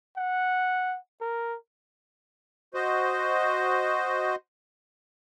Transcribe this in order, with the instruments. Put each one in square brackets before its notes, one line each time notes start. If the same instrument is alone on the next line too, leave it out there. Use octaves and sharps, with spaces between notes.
[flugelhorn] F#5
A#4
[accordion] F#4 C5 D#5